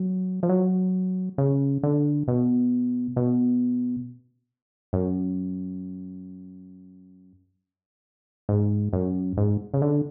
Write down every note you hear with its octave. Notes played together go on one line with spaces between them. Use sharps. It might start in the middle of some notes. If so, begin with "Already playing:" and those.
Already playing: F#3
F3
F#3
C#3
D3
B2
B2
F#2
G#2
F#2
G#2
C#3
D3